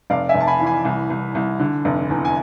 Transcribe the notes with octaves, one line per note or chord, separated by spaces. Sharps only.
F1 D5 F5
E5 G#5
F1
A5
G#5 B5
E3
G#5 B5
C2
C2
C2
D3
F1
E2
G#5